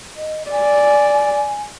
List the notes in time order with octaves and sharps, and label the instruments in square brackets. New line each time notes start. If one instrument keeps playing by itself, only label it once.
[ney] D#5
[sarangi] D5 [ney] G#5